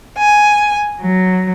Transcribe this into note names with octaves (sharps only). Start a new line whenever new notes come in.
G#5
F#3